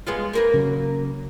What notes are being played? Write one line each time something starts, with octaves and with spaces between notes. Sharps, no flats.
G#3 B3 F4
A#3 A#4 B4
C#3 F#3